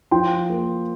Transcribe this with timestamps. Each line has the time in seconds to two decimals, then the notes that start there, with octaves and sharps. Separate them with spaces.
0.11 F3 G5 C6
0.50 A#3